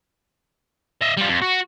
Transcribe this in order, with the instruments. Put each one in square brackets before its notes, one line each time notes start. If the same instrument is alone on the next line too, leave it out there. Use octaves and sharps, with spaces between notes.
[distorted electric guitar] D#5 E5
G3 F4
F2
F#4